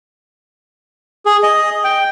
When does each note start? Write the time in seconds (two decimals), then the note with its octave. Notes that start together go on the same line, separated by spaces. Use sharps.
1.26 G#4
1.43 D#5
1.84 G5